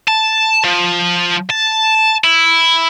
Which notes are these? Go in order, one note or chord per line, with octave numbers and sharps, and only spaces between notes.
A5
F3
A5
E4